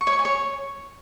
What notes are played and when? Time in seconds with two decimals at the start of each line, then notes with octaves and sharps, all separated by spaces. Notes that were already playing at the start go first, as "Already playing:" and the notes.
0.01 C#6
0.07 C#5
0.13 C#6
0.19 G#5
0.25 C#5